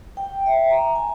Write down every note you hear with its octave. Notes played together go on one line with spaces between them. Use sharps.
G5
E5
A#5
G#5